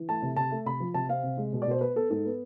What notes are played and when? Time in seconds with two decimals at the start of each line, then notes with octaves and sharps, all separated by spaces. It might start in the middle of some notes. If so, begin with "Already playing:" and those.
Already playing: E3
0.09 A3 A5
0.22 C3
0.37 C3 A5
0.52 A3
0.66 C3 B5
0.80 F3
0.94 C3 A5
1.09 C4 F5
1.23 C3
1.37 G#3
1.53 B2
1.62 D5
1.67 B2 C5
1.81 B3 B4
1.96 B3 A4
2.10 G#2 A4
2.25 B3